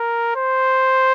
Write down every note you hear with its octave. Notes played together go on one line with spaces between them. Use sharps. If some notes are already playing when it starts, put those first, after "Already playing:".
Already playing: A#4
C5